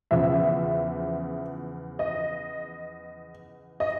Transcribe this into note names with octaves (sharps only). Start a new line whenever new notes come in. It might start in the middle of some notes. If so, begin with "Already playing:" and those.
E2 C#3 F3 E5
D#5
D#5